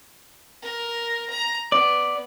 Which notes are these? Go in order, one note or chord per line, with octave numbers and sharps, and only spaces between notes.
A#4
A#5
B3 D5